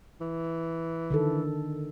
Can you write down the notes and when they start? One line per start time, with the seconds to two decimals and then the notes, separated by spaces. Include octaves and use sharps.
0.20 E3
1.11 D3 D#3 A4